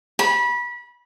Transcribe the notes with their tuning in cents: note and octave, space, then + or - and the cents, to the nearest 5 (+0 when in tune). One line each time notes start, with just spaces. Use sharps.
B5 -25